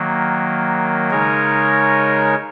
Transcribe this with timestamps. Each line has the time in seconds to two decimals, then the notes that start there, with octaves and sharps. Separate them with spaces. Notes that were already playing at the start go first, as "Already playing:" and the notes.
Already playing: D#3 F#3 A#3
1.10 C#3 G#3 D#4 A#4 C#5